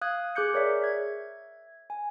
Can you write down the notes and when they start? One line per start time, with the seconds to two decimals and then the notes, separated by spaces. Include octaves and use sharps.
0.01 F5 D#6 F#6 G#6
0.35 G#4 D6 F#6 G6 C#7
0.53 G#4 A#4 C#5 D5 E5
0.82 E5 G#6
1.90 G#5